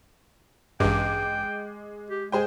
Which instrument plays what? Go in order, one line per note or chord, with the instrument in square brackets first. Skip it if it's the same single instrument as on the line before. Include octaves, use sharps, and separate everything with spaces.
[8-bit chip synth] A1 G2 [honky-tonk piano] G#3 D6 [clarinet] G5
[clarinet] G4
[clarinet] G#3 [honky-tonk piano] G#4 C5 G5